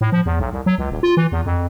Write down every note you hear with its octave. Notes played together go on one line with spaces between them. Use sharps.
A2
F3
E2
B1
C2
F#3
C#2
D#1
F4
E3
E2
F2